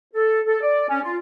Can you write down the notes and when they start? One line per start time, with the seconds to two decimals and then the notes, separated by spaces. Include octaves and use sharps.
0.14 A4
0.46 A4
0.61 D5
0.89 C#4
1.04 F4